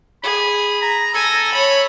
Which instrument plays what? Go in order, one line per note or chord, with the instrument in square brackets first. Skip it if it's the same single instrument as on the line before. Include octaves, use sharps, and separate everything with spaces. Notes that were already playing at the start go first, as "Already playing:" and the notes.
[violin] G#4 [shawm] B5
[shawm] A#5
[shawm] A4 [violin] G#5 A#6
[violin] C#5 B5